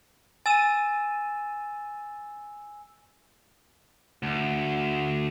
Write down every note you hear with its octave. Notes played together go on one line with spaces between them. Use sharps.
G#5 E6 A6 D#7 E7
D2